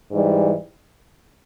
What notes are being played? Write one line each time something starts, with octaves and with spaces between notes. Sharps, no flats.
G#2 E3 G3